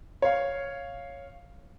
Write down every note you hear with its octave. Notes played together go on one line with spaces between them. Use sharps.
C#5 F5